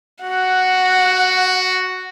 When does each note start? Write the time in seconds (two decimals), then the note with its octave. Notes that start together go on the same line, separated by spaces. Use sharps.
0.22 F#4 F#5